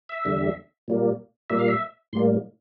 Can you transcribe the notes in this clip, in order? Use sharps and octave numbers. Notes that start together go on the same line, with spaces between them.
E5
E2 D3 G3
A#2 G3 A#3
A#2 G3 A#3 E5
F5
E5
A2 G3 A#3 C6